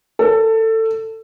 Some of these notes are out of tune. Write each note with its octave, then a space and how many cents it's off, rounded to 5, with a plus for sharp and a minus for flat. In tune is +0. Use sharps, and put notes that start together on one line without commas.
A4 +20